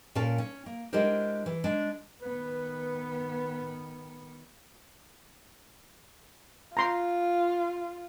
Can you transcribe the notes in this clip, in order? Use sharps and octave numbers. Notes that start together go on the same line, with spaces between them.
A#2 C#4 A#4 F5 A5
C#4
A#3
G#3 D4 E4 G4 A#4 C5
E3
G#3 D4
D#3 B3 B4
F4 A#5 C6